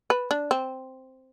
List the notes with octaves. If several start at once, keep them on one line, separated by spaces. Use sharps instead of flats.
B4
D4
C4